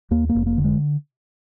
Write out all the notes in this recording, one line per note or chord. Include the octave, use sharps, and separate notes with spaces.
D#2 A#3
A#3
F1
A#3
D3
G#3